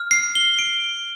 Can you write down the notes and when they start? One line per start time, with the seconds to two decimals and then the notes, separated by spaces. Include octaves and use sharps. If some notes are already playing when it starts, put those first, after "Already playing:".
Already playing: F6
0.11 C7
0.35 G7
0.59 D7